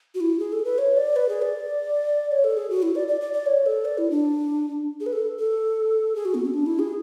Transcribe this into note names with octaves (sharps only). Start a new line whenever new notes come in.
F#4
E4
G#4
A4
B4
C#5
D5
B4
G#4
D5
C#5
A4
G#4
F#4
E4
D5
D5
D5
D5
C#5
A4
D5
E4
D4
G#4
B4
A4
A4
G#4
F#4
B3
C#4
D4
E4
G#4